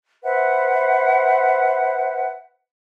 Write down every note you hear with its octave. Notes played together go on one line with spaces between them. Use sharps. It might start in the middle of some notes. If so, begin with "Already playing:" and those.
B4 C5 E5 F#5